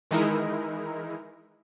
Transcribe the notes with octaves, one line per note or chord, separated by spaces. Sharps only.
D#3 E3 G#3 D#4 E4 A#4